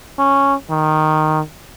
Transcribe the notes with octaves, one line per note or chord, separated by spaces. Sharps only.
C#4
D#3